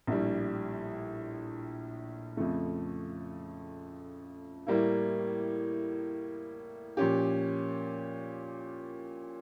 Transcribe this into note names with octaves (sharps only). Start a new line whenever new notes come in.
A#1 A2 G3
F2 C#3 F3 A3
A2 G3 A#3 E4
A#2 F3 C#4 G4